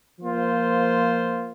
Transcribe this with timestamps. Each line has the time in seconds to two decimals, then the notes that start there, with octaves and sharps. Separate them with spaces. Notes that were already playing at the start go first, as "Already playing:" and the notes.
0.19 F3 A#3 F4 C5